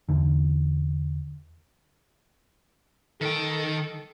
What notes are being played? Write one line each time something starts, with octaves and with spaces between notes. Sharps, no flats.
E2 D3
D#3 A4 G5